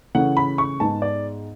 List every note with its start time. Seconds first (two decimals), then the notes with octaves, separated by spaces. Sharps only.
0.15 C#3 E3 A3 C#4 F#5
0.37 B5
0.58 C#6
0.80 G#2 G#3 B3 A5
1.02 D5